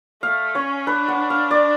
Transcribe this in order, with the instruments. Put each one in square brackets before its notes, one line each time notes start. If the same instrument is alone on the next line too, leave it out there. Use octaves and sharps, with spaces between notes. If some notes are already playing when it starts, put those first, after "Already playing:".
[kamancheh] A3 [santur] F5
[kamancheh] C#4 [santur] C#5
[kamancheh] D4 [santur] B4
[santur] F#5
F5
D5